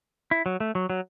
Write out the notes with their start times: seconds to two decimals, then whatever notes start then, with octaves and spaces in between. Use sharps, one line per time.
0.31 E4
0.46 F#3
0.60 A3
0.75 F#3
0.90 F#3